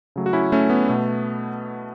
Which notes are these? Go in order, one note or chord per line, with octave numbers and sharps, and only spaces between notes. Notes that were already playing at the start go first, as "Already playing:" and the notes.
C#3 F#3 A3
F#4
C#4 E4
A3 C#4
B3
B2 A3